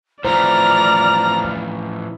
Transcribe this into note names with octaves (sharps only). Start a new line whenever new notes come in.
A2 E3 F3 C5 D5 A#5 F6